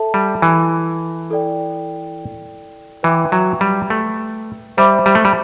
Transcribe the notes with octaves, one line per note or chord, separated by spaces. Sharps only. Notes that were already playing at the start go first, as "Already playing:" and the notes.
Already playing: A4 E5 A5
G3
E3
E4 A4 D5 G5
E3 B4 E5 G5 D6
F#3
G3
A3
G3 C5 E5 B5 D6
G3
A3
G3